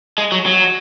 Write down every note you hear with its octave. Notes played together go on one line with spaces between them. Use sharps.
G#3
F#3
F#3